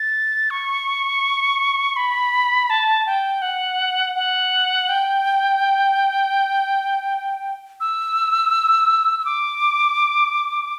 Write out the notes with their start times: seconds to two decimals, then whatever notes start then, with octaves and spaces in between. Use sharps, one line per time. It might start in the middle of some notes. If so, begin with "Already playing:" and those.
Already playing: A6
0.50 C#6
1.97 B5
2.70 A5
3.07 G5
3.42 F#5
4.15 F#5
4.89 G5
7.80 E6
9.19 E6
9.25 D6